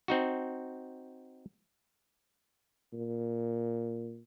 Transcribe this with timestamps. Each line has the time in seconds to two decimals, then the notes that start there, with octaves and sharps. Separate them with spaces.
0.08 C4 D#4 F#4
2.93 A#2